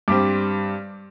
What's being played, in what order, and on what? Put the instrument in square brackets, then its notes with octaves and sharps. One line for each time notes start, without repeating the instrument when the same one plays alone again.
[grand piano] G2 G3 C4 D6